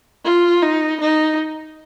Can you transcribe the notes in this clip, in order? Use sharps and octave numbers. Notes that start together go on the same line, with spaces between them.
F4
D#4
D#4